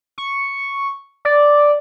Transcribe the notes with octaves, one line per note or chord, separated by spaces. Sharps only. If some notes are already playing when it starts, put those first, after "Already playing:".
C#6
D5